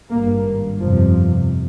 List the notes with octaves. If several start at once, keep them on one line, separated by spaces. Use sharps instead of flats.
G#1 G2 A#3
G1 F2 C3 F3